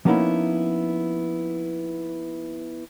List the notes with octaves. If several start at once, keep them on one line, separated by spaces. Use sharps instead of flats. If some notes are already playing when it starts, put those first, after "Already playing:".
F3 A#3 B3 C#4 D#4 E4